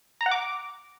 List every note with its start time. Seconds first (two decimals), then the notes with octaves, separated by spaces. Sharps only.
0.21 A#5
0.26 F#5
0.31 D6